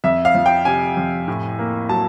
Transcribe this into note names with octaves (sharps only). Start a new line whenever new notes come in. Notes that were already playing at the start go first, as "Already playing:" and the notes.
F2 E5
F5
F3
G5
C3 G#5
F2
A2
A#3
F#3 A5